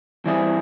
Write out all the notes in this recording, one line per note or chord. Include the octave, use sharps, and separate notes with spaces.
E3 G3 C4 E4 G#4